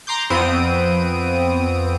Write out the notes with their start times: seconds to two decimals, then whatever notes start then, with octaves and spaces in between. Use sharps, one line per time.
0.07 A#5 C6 D6 G6
0.30 F2 B3 C4 D#6 D7 D#7